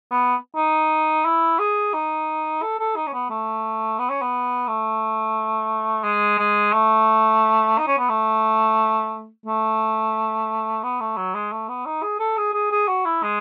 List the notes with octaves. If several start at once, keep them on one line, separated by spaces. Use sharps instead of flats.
B3
D#4
E4
G#4
D#4
A4
A4
D#4
C#4
B3
A3
B3
C#4
B3
A3
G#3
G#3
A3
D#4
C#4
B3
A3
A3
B3
A3
F#3
G#3
A3
B3
D#4
G#4
A4
G#4
G#4
G#4
F#4
E4
G#3